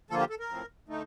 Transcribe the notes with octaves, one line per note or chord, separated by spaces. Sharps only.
D3 F3 A#3 F4 A4
G4
A4
A#4
A2 F3 C4
D3 A3 D#4